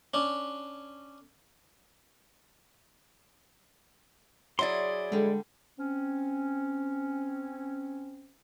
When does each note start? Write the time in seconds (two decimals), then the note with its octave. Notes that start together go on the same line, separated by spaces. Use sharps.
0.14 C#4 D4
4.59 F#3 E4 G#4 D5 C6
5.12 D3 G3 G#3
5.79 C4 C#4